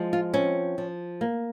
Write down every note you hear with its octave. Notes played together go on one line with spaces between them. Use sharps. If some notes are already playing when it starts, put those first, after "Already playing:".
Already playing: F3 G#3
F4
C4 C#4
F3
A#3